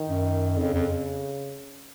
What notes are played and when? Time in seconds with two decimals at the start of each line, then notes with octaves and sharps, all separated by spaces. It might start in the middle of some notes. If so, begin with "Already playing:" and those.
Already playing: D#3
0.09 F#2
0.58 F2 C#3
0.74 F2